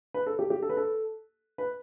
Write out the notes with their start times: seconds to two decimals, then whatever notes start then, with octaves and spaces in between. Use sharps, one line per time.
0.14 B4
0.26 A4
0.39 G4
0.50 G4
0.62 A4
0.69 B4
0.77 A4
1.58 B4